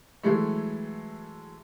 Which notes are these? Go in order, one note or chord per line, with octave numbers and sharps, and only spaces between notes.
E3 F#3 G#3 A3